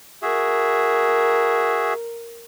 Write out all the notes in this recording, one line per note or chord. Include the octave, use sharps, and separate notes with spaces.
F#4 G#4 A#4 E5